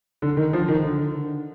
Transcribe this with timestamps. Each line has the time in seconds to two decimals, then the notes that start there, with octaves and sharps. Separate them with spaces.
0.22 D3
0.37 D#3
0.53 F3
0.68 D#3
0.84 D3